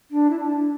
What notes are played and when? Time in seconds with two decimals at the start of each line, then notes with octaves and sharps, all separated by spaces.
0.11 D4
0.30 E4
0.40 D4